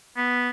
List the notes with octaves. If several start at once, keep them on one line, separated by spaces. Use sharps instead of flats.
B3